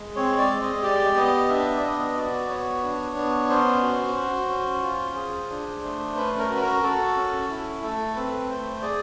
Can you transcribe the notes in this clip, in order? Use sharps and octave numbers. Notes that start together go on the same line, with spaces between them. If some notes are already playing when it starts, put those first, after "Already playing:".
Already playing: G#3
C4 C#5
D5
G#3
D#5
G4 D5
B3 D#5
D4 E5
D5
B3 D#5
F#4 D5
B3 C#5
D4
B3
C#4 C5
F#4
F#4
C#4
F4
G#4
D4
A3
C#4 B4
A#4
F#4
B4
A#4
F#4 A4
C#4
E4
A3 A4
C4 B4
A3 C5
G#4 D5